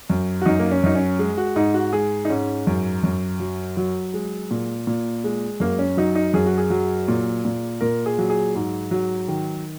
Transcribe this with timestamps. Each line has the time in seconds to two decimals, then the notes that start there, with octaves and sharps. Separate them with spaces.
0.10 F#2
0.41 F#4
0.46 F#2 D#4
0.59 A#3
0.71 C#4
0.84 F#2 D#4
0.95 C#4
1.19 G#3
1.37 F#4
1.56 G#2 D#4
1.74 F#4
1.93 G#3 G#4
2.25 D#4
2.29 G#2 C#4
2.67 F#2
3.04 F#2
3.40 F#3
3.77 F#3
4.14 G#3
4.51 A#2
4.87 A#2
5.24 G#3
5.60 F#2 A#3
5.79 C#4
5.97 F#3 D#4
6.15 D#4
6.34 F#2 G#4
6.46 F#4
6.58 G#4
6.70 F#3
7.08 A#2
7.45 A#2
7.81 A#2 A#4
8.06 G#4
8.19 F#3
8.30 G#4
8.55 G#2
8.91 F#3
9.28 D#3